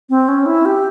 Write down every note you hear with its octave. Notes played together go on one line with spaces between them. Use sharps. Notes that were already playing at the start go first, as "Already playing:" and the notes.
C4
C#4
E4
G4